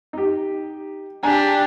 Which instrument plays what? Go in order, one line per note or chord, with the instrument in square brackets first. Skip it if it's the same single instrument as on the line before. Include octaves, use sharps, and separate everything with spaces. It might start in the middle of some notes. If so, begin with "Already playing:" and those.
[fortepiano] D#4 G4
[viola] D4 G4 [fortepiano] G#5 A#5